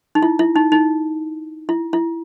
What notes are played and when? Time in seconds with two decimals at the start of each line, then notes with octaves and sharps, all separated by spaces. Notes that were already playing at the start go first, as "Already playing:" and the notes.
0.15 D#4
0.22 E4
0.39 E4
0.56 D#4
0.72 D#4
1.69 E4
1.93 E4